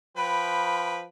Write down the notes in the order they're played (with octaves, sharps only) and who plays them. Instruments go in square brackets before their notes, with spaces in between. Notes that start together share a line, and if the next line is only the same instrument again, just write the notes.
[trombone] F3 [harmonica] B4 G5 [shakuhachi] B5